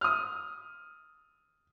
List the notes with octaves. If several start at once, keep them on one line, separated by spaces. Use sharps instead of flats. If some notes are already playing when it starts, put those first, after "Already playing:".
D#6 F6